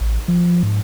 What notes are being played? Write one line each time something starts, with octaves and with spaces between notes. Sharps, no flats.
A1
F3
G#2